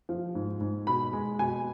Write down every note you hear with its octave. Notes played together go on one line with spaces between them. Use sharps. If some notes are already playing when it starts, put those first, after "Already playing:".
F3
G#2
G#2
B2 B5
G#3
B2 G#5